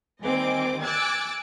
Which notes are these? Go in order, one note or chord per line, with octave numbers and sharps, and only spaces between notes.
D#2 G3 C4 D#5 G#5 D6
G#5 D6 E6 F#6 G#6 A6